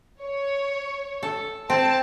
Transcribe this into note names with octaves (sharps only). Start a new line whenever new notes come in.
C#5
A4
C4 A5